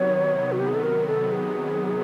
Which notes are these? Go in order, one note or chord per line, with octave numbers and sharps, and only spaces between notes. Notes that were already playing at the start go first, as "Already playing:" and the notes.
Already playing: C3 D#3 F#3 B3 C#5
F#4
G4
G#4
A4
A#4
A4
G#4